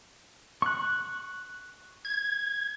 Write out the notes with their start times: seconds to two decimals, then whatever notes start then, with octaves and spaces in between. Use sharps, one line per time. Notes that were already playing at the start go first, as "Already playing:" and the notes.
0.62 C#6 F#6
2.05 G#6